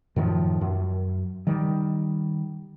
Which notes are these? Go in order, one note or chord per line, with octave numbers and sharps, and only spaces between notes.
F#2 A2 D#3 F3
F#2
D#3 G3